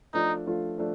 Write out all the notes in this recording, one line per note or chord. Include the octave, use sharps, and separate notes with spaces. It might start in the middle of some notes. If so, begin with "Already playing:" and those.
F3 A3 D4 D#4 F4
F3 A3 D4 F4
F3 A3 D4